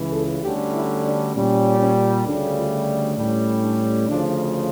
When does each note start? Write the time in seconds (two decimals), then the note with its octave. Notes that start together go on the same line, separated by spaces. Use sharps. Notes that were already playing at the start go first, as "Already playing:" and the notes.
Already playing: C#2 C#3 E3
0.12 A4
0.42 D2 D3 G3 C#4 G4
0.73 E4
1.04 D4
1.34 A#2 G3 C#4
1.79 C#4
2.25 D2 C#3 G3 D4
2.55 F4
3.16 A2 G3 C#4 D4
3.62 D4
4.08 D2 C#3 F3 D4